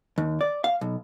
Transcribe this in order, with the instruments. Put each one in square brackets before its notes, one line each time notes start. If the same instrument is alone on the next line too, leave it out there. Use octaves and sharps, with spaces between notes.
[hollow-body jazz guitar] D#2
D5
F5
B1